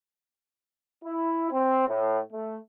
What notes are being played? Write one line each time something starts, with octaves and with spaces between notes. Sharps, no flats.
E4
C4
A2
A3